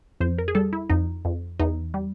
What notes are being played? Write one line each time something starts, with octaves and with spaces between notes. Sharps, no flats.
F2 C5
A#4
G#4
G3 A4
E4
F2 D#4
F2
E2 D#4
G3